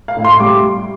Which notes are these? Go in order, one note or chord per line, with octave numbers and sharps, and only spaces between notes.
F5
A2
C6
G3 D6